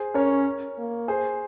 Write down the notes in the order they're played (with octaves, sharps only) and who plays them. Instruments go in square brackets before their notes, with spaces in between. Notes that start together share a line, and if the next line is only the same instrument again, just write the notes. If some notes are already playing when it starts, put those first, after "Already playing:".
Already playing: [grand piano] G#4 C5
[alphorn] C#4 [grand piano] A#4 C#5
[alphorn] A#3
[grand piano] G#4 C5